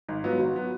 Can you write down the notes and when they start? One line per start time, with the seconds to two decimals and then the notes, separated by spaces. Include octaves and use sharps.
0.09 G#1 D#4
0.24 G#2 F#3 B3 F4
0.39 G#1 F#4
0.55 F#3 B3